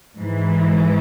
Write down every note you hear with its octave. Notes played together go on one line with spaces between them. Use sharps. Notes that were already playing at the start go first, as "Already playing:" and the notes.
G#2 E3